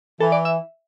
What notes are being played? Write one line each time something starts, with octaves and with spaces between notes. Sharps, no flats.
E3 A4
D5
E5